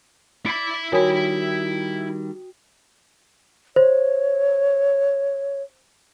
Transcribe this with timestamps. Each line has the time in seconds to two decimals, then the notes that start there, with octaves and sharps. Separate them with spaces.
0.46 E4 D5 B5
0.92 D#3 G3 F#4 A#4 C#5 G5 G#5 D#6
3.76 C5 C#5